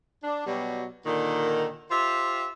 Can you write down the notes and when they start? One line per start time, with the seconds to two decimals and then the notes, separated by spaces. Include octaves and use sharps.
0.24 D4
0.47 B2 F#3 G3
1.06 A#2 D3 D#3
1.91 F4 G4 C5 E5